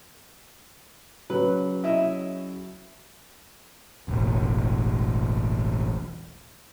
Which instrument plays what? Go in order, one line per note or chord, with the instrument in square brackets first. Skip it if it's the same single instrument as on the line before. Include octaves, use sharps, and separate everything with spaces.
[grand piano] C#3 F#3 [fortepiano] B4
[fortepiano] E4 D#5 E5
[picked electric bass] E1 A1